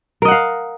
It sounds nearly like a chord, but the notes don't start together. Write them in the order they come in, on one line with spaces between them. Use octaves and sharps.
A#4 D#5 F#5 F5